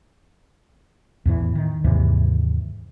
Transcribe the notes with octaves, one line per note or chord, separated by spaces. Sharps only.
E2 A2 E3
D#3
D#2 G#2 C3 E3